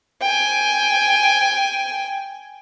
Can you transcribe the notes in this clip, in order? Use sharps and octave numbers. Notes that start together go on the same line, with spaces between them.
G5 G#5